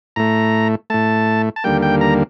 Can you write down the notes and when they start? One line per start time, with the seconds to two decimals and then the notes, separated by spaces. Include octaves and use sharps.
0.16 A2 A3 A#5
0.90 A2 A3 A5
1.56 A5
1.64 D#2 D3 G3 A#3 G5
1.83 G5
2.01 A#5